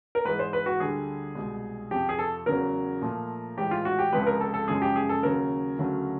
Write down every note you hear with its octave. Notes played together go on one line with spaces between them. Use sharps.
A#4
G#2 E3 G#3 B4
C5
B4
F#4
D2 D3 G3 G#4
C2 B2 G#3
F2 C3 F3 G4
G#4
A4
E2 C#3 F#3 A#4
A#2 F3 A3
A2 E3 G#3 G4
F4
F#4
G4
C#2 C3 F3 G#3 B4
A#4
A4
A4
F#2 C#3 F3 G#3 G#4
G4
G#4
A4
D#2 C#3 F#3 A#4
D2 C#3 F#3 A3